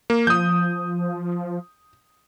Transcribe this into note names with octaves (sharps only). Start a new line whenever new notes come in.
A#3
F3 D#6 G6